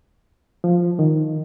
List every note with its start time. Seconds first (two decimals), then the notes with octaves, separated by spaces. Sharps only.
0.64 F3
0.99 D#3